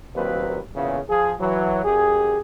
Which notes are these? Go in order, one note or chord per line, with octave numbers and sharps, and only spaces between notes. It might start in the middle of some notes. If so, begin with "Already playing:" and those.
D#2 A#2 F#3 C4 B4
E2 A#2 C#3
F3 G#4
E3 F#3
F#2 G4 G#4